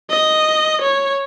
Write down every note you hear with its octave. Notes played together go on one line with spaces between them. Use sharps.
D#5
C#5